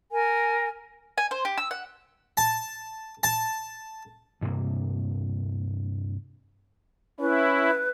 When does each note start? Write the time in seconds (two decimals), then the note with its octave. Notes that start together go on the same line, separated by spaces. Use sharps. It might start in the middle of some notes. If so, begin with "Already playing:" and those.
0.11 A#4 G#5
1.18 G#5
1.31 C5
1.45 G4
1.58 E6
1.71 F#5
2.37 A5
3.23 A5
4.41 D2 G2 C3 A#3
7.20 C#4 E4 B4